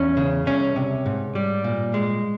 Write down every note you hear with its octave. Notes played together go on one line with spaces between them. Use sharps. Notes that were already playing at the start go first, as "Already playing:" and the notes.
Already playing: E2 C#4
C#3
C2 C#4
C3
G#2
G3
A#2
G#3